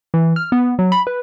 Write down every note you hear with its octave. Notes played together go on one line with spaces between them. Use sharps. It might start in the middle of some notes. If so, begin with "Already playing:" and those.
E3
F6
B3
F#3
B5
B4